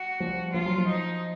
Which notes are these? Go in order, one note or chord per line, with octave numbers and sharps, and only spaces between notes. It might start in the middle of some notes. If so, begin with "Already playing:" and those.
Already playing: F#4
F3 G3
F3 F4
F#3
F3
D#4